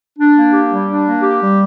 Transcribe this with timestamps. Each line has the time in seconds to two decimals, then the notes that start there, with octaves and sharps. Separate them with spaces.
0.18 D4
0.36 A#3
0.53 G4
0.71 G3
0.88 D4
1.05 A#3
1.23 G4
1.41 G3